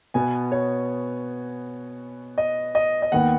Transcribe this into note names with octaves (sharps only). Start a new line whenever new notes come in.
B2 B3 G#5
C#5
D#5
D#5
D#5
D#2 D#3 B3 F#5